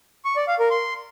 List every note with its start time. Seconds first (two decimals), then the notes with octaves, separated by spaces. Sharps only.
0.25 C#6
0.36 D5
0.48 F5
0.59 A#4
0.71 C6